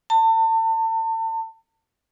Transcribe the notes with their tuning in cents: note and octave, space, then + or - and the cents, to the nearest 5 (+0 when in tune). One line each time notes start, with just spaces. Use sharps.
A5 +35